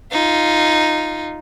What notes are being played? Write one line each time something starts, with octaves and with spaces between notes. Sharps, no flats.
D#4 F4